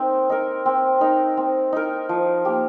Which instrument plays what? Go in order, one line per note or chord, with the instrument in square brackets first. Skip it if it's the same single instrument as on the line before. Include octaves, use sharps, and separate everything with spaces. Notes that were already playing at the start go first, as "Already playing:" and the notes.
Already playing: [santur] C4 D#4 A#4
D#4 A#4
C4
D#4 A#4
C4
D#4 A#4
F3
A#3 G4